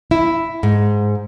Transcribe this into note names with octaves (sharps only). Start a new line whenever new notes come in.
E4
G#2